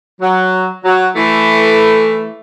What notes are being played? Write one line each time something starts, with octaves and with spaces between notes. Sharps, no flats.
F#3
F#3
E3 A3